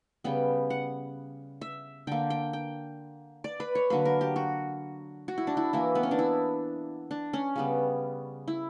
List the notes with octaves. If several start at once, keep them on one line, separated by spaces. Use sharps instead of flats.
C#3 G3 B3 G5
F#5
E5
D3 A#3 G5
G5
G5
D5
B4
C#5
D3 F#3 A#3 B4
A#4
G4
F#4
F#4
E4
D4
E4
E3 A#3 E4
B3
C#4
D4
E4
D4
C#4
C#3 G3 B3
E4